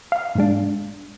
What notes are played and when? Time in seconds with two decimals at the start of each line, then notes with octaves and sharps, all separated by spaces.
0.12 F5
0.35 G#2 G#3 D4